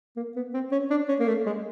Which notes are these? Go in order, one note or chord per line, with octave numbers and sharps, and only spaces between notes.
A#3
B3
C4
C#4
D4
C#4
A#3
A3
G#3